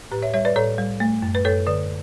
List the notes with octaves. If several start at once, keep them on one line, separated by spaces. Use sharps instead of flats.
A2 G4 B4
C#5 E5
G3 C#5 E5
B4 D5
A2 A4 C#5
G3
A3
F#2
B4
F#2 A4 C#5
D3 B4 D5